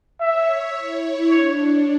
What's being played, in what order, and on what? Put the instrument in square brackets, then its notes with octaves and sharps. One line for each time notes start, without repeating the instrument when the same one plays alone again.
[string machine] C#5 [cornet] E5
[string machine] E4
[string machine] D4 [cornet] C#5